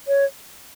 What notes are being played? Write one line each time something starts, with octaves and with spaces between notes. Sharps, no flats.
C#5